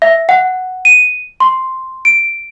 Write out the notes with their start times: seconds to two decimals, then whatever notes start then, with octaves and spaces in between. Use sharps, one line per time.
0.02 E5
0.29 F#5
0.85 D#7
1.40 C6
2.05 D7